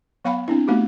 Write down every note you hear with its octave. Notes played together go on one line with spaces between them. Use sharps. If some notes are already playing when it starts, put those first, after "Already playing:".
F#3 B3 F5 G5 B5
C4 D4 E4
A3 B3 D#4 F#4 G4